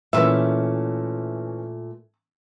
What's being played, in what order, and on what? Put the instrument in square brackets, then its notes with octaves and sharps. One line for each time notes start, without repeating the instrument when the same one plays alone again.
[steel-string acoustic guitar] A#2 A3 [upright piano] E3 C#4 [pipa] B4 E5